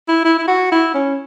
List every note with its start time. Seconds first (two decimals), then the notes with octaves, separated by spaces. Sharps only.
0.08 E4
0.25 E4
0.38 E4
0.48 F#4
0.72 E4
0.94 C#4